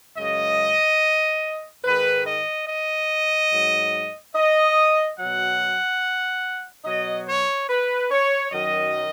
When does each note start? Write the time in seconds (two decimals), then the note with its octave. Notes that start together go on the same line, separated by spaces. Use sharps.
0.17 F#2 C#3 G#3 D#5
1.84 G#2 D#3 G#3 B4
2.26 D#5
2.67 D#5
3.51 G#2 F#3
4.35 D#5
5.17 B2 F#3 F#5
6.84 B2 F#3 D#5
7.27 C#5
7.68 B4
8.10 C#5
8.52 F#2 D#3 F#3 D#5